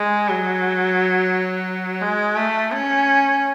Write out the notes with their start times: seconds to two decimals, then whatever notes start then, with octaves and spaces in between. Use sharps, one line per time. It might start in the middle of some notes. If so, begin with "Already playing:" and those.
Already playing: G#3
0.29 F#3
2.01 G#3
2.36 A3
2.71 C#4